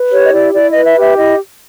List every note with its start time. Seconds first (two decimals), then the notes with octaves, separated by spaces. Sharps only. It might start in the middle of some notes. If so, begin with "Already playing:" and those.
Already playing: B4
0.13 G4 C#5
0.25 D#5
0.33 E4 D5
0.54 E4 D5
0.70 D#5
0.75 B4
0.85 E5
0.96 G4 E5
1.17 E4 D#5